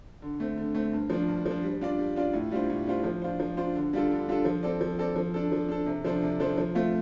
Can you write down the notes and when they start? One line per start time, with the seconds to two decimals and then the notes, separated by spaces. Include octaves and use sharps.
0.22 D3
0.40 A3 C4
0.57 D3
0.75 A3 C4
0.93 G2
1.10 F3 D4
1.28 G2
1.46 F3 D4
1.63 G3
1.81 D4 F4 D5
1.99 G3
2.16 D4 F4 D5
2.33 A2
2.51 G3 D4 F4 C5
2.70 A2
2.86 G3 D4 F4 C5
3.04 F3
3.22 D4 F4 C5
3.40 F3
3.57 D4 F4 C5
3.76 D3
3.93 G3 D4 F4 A4
4.11 D3
4.28 G3 D4 F4 A4
4.45 F3
4.63 C4 A4 D5
4.81 F3
4.99 C4 A4 D5
5.16 F3
5.34 D4 A4
5.52 F3
5.69 D4 A4
5.86 C3
6.05 F3 D4 A4 C5
6.22 C3
6.40 F3 D4 A4 C5
6.58 F3
6.75 A3 C4 F4